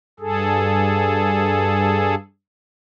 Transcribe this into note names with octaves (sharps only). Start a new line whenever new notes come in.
G2 G#4 A4